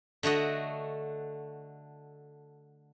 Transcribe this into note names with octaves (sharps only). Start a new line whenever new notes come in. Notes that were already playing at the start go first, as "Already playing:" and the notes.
D3 A3 F#4 D#5